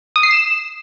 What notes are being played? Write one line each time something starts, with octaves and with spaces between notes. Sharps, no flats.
D#6
C7
E7